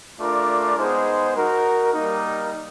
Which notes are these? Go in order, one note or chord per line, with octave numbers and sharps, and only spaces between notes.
A3 D4 F4 A#4 D5
G#3 B3 D#4 G#4 C5
D#4 F#4 A#4
G3 A#3 D#4